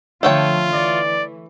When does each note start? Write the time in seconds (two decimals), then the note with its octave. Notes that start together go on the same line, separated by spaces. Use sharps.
0.23 D3 F3 A3 F4 C#5 G5
0.74 E3 D5